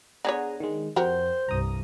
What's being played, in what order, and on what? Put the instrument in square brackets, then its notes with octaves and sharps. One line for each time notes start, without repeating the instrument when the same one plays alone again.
[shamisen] D3 B3 C#5 [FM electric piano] G#4 G#5 A#5
[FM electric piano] D#3 G#3
[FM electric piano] F2 [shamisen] F#4 G4 A#4 [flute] C5
[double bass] C2 G2 [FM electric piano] A#5 D#6